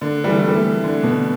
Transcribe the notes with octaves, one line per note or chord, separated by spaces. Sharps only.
D3
G3
E3
A3
G3
E3
D3
B2